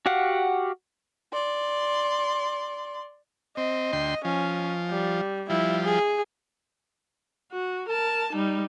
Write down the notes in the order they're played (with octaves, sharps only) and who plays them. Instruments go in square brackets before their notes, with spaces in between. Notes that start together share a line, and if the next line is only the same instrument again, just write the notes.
[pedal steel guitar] F#4 G4 F5 F#5
[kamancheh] D5 C6
[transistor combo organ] C4 [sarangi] D#5
[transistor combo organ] D2 G5 C6
[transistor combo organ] F3 [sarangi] C#4
[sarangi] G3
[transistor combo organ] F3 G3 [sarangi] E4
[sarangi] G#4
[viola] F#4
A#4 A5
G3 D#4